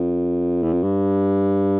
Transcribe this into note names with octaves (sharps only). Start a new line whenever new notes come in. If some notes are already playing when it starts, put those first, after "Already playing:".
Already playing: F2
E2
F2
G2